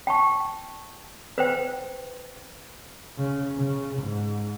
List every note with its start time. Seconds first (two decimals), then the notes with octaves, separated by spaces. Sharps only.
0.07 G5 A5 C#6
1.38 B4 C5 G5
3.18 C#3
3.58 C#3
4.00 G#2